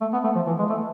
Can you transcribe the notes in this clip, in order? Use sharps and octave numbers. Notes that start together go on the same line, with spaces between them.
A3
B3
A3
F3
E3
G#3
A3